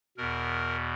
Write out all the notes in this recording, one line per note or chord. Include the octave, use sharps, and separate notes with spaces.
E2 B2 A#4